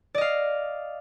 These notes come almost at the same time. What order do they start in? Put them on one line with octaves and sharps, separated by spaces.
D5 D#5 F5